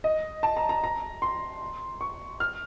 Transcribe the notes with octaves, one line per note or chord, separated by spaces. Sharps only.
D#5
A5
A#5
A#5
A#5
C6
C#6
F6